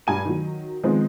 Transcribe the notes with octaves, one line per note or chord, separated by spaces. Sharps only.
G2 G#5 D#7
D#3 F#3
D#3 F3 G#3 B3 C4